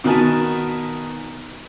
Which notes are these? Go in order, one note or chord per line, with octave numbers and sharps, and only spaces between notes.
B2 D#3 B3 A#4 G#5 A5